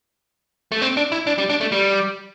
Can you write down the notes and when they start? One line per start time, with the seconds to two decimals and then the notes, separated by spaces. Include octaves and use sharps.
0.72 A3
0.81 C4
0.97 D4
1.12 E4
1.27 D4
1.38 G3
1.49 D4
1.61 A3
1.72 G3